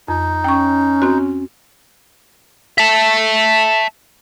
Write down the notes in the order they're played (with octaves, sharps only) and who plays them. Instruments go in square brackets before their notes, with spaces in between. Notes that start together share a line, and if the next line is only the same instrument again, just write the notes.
[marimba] F2 [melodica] D#4
[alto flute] C#4 [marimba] G5 C#6
[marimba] C4 F#4
[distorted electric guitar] E5 A5